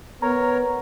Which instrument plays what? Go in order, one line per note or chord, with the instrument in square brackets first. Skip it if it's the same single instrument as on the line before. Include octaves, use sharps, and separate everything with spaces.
[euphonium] B3 [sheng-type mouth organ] A#4 C#5 [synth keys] A#5